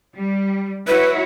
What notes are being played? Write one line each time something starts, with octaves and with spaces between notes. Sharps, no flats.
G3
E4 F#4 B4 C#5